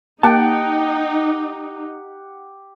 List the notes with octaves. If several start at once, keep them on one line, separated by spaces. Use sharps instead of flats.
A#3 D#4 G4 F#5 G5 A5